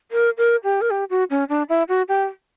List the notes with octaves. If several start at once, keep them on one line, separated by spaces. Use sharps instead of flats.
A#4
A#4
G4
A#4
G4
F#4
C#4
D4
E4
F#4
G4